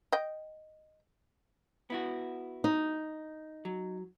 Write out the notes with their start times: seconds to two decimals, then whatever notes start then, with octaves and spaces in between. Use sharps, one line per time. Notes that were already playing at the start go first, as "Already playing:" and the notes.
0.12 D#5 G5
1.90 B3 E4 F#4
2.64 D#4
3.65 F#3